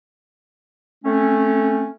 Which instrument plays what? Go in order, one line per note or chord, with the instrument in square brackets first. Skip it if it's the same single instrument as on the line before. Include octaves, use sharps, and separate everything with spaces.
[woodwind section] A3 C4 C#4